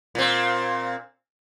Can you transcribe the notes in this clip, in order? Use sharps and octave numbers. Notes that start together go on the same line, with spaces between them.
A#2 C4